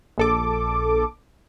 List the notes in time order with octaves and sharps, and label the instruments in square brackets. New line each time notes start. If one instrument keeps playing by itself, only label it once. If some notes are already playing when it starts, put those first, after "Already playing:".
[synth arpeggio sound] A#1 A4 D6